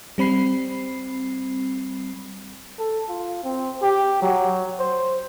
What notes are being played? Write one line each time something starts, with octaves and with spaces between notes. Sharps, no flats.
G3 C4 B5 C7
A4
F4
C4
G4
F#3
C5